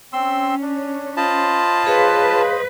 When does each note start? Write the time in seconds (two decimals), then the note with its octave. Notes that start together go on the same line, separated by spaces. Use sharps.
0.13 C4 C#4 C6 E6
0.62 D4
1.17 F4 C5 D#5 A5 B5
1.86 G#4 B4 C#5 F5